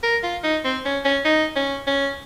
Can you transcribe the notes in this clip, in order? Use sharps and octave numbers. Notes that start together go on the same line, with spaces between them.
A#4
F4
D#4
C4
C#4
C#4
D#4
C#4
C#4